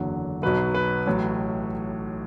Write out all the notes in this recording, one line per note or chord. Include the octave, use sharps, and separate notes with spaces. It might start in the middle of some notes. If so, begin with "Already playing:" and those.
Already playing: F#1 E2 D3 F#3
B1 B2 F#3 B4
B4
A1 A2 F#3